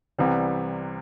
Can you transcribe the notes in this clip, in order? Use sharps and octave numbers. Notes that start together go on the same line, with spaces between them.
C2 C3 E3 G3